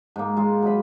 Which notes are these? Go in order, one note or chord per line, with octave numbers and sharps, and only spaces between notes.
G#2 A#3
G#3 F4
F#3 D#5 B5